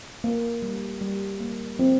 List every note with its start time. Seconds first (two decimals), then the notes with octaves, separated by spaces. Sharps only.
0.24 A#3
0.62 G3
1.01 G3
1.40 A#3
1.79 F3 C4